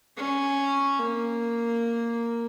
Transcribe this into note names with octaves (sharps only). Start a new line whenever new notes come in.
C#4
A#3